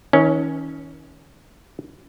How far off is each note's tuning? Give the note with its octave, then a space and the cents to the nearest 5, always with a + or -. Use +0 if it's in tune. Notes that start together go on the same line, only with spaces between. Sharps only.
D#3 +40 C#4 +0